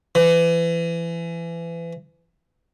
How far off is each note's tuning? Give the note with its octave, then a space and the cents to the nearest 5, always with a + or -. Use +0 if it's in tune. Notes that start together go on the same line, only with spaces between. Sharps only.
E3 +30